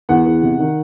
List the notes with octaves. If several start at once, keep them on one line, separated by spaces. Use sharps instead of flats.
E2 F#5
E2
C3
D#3